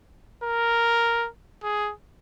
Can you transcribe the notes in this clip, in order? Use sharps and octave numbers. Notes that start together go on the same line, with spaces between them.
A#4
G#4